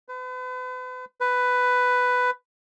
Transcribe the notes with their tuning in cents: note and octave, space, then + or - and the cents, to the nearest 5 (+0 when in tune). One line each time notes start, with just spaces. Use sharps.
B4 +40
B4 +10